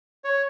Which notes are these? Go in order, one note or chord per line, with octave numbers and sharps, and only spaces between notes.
C#5